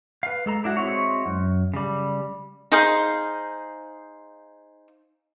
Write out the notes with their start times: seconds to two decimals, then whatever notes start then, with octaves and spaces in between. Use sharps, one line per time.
0.23 B4 F5
0.46 G#3 A4 A#5
0.64 D4 E4 F#4
0.77 G#3 C4 E4 F#4 C#5
1.26 F#2
1.74 C#3 G3
2.72 D#4 G#4 C5 F5